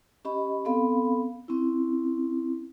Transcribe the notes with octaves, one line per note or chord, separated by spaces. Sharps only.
C#4 G4 D#5 B5
B3 C4 A4 F5 B5
C4 C#4 E4